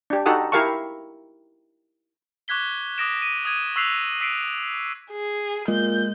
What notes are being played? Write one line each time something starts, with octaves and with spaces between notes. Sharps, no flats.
D4 G4
D#4 F#4 G4 A4 F#5 D#6
E4 G4 A#4 F5 A5 C#6
C#6 D6 F#6 G#6 B6 G7
D6 D#6 F#6 A#6 D7 E7
D#7
D#6 G#6 D#7
C#6 E6 F#6 B6 C7 F7
E6 B6 C7 D7
G#4
A#2 G#3 G6